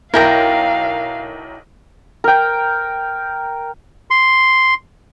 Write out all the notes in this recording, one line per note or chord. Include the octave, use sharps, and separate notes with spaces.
B1 E4 A#4 F5 G5 A#5
A#4 G5
C6